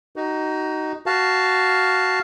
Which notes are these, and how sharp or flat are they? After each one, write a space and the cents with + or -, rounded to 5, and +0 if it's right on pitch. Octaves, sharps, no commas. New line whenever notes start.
D#4 +0 F#4 +30
F#4 +10 F5 +0 A5 +0